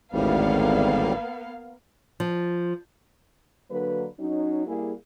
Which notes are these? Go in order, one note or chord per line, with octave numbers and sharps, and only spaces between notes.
G#1 D2 A2 G3 A#3 B3 F5
F3
D3 F#3 A#3 D4 B4
F#3 C#4 D#4
G3 A#3 E4 G#4